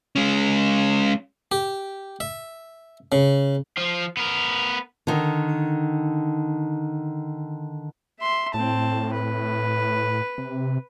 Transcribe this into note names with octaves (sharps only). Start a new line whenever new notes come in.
G#3 C#4
G4
E5
C#3
F3 F4
B3 A#4
D3 D#3
E5 C6
A2 C4 A5
B4
C3